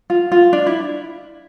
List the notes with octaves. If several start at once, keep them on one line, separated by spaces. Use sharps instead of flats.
F4
F4
D4
E4